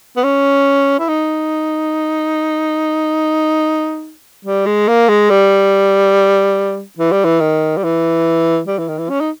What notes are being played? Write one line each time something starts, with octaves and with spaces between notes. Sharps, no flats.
B3
C#4
E4
D#4
G3
G#3
A#3
G#3
G3
E3
G3
E3
D#3
G3
E3
G3
E3
D#3
E3
C#4
D#4